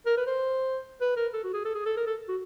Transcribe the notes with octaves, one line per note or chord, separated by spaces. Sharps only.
A#4
B4
C5
B4
A#4
A4
F#4
G#4
A4
G#4
A4
A#4
A4
F#4